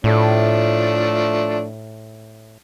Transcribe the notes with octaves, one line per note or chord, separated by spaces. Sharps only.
A2 F3 A3 D4